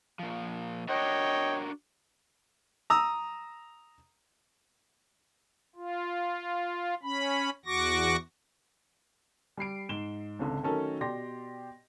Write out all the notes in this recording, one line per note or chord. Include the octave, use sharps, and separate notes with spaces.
A#2 F3
D4 F#4 A#4 C#5 D#5 G5
A#5 D#6 E6
F4
C#4 B5
E2 F#4 C#6 D6 A#6
G3 B5 C7 D7
G#2 E7 G7
G#1 C#2 D3
D#3 F#3 A3 C#4 A4 A#4
B2 G4 D5 G5 C6 A#6